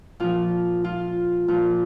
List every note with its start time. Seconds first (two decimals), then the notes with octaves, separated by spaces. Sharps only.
0.20 A#2 F3 F4
0.84 F4
1.48 A#2 F3 F4